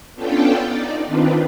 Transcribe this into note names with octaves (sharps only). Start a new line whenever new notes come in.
B3 C#4 D4 F4 A4 G5
D#4 D5
D#3 C4 D4 F4 B4